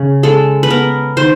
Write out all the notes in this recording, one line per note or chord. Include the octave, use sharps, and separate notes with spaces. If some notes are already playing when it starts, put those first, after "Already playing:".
Already playing: C#3
G#3 A4
B4
B3 A#4
D#3 C5